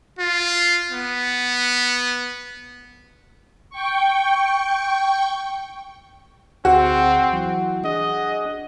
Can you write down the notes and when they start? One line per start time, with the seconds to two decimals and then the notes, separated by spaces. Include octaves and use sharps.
0.19 F4
0.91 B3
3.70 G5 C#6
6.65 D2 C4 F#4 G#4
7.33 E3 F#3
7.84 D4 G#4 D#5 F#5